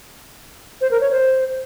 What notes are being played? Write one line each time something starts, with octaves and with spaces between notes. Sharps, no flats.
C5
A#4
C#5
C5